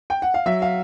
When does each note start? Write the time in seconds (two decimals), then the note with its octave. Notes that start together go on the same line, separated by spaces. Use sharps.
0.10 G5
0.22 F#5
0.34 F5
0.46 F#3 E5
0.62 F5